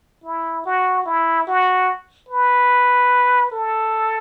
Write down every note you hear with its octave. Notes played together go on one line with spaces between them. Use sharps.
E4
F#4
E4
F#4
B4
A4